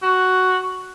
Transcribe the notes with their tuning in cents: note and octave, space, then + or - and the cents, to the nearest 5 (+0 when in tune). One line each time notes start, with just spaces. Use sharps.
F#4 +5